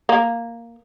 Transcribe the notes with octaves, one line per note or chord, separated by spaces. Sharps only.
A#3